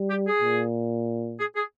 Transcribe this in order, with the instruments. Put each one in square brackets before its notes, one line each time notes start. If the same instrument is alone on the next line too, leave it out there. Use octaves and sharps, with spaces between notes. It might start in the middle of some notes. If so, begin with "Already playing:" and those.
Already playing: [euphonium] G3
[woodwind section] G4
G#4
[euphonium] A#2
[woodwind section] G#4
G#4